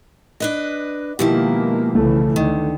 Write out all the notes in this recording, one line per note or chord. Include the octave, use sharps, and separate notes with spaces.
D4 B4 D#5
B2 D#3 F3 G#3 A#3 E4 G4
C2 C#3 E3 A3
D2 D3 D#3